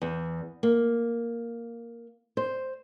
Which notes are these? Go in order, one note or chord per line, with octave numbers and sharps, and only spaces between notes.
E2
A#3
C5